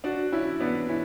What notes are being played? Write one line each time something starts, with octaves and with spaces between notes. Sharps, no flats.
D4 F#4
C#4 E4
B3 D4
C#4 E4